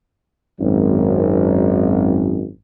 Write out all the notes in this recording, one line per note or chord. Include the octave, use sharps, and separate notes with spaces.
G#1 F#2